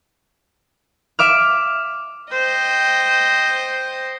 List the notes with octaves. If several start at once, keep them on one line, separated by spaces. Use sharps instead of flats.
E5 D6 F6
C5 D#5 G5